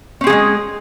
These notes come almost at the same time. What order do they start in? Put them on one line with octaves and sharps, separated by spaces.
C#4 C4 G#4 F#3 G#3